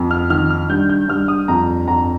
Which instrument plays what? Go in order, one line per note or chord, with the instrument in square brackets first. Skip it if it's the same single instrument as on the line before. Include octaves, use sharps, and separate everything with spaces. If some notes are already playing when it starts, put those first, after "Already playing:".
Already playing: [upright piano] F2
F6
D#3 F6
F6
G2 G6
G6
G2 F6
D#6
F2 A#5
F2 A#5